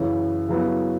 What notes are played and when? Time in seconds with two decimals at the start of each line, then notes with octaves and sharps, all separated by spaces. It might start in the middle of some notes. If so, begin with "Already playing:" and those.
Already playing: F#2 C#3 E3
0.48 C#3 F#3 B3 E4